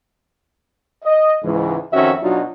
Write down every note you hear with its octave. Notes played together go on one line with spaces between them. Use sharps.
D#5
C#2 G#2 E3
F2 D#3 C4 C#4 F#4 E5
B2 F#3 D4 D#4 F4 F#4